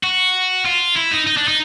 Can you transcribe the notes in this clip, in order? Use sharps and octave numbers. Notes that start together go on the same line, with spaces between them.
F#4
F4
E4
D#4
D#4
D4
D#4